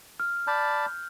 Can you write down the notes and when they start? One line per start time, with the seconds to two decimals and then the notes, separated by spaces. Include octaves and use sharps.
0.20 F6
0.47 D5 A5 B5 G6